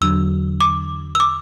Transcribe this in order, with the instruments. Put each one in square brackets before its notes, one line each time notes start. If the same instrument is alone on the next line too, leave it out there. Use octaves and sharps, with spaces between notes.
[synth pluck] E2 D3 F#3 [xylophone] E6
[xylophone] D6
E6
D6